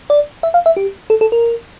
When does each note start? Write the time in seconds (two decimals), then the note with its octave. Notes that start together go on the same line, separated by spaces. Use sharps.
0.10 D5
0.43 E5
0.54 F5
0.66 E5
0.77 G4
1.10 A4
1.21 A4
1.32 A#4